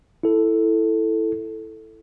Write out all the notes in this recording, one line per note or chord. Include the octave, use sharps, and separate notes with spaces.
E4 A4